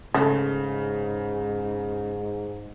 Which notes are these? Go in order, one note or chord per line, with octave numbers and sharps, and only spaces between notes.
G#2 C#3 A3